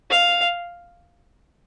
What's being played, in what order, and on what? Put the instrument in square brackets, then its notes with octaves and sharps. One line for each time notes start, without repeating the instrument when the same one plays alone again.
[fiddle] F5